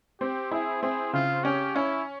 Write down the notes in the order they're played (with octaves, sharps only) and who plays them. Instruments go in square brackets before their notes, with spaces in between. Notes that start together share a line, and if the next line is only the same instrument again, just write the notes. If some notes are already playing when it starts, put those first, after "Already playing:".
[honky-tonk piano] C4 [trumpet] G4
[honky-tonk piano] E4 [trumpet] G#4
[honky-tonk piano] C4 [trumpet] G#4
[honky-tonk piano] C#3 [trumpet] F4
[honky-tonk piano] C#4 [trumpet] G4
[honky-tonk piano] C#4 [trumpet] E4